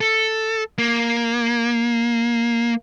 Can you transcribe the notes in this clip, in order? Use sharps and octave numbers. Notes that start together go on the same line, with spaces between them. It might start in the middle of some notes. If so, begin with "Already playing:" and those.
A4
A#3